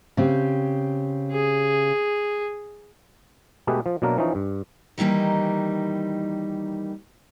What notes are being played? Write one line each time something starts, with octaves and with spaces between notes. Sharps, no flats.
C#3 C4 G4
G#4
B2 G#3 A3 G4 G#4 B4
F3
B2 F#3 A#3 D4 A#4
E3 F3 C#4 D#4
G2
D#3 E3 G3 A#3 D#4